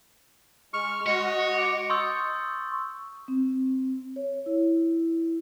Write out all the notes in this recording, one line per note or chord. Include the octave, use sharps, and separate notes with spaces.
G#3 C#6 F6
G#3 F#4 C#5 D#5
D6
C6 C#6 D#6 E6 G6 A6
C4
C#5
E4